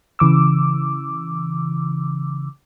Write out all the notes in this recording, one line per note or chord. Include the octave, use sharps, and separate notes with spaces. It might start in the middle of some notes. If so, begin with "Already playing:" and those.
C#3 E3 D6 E6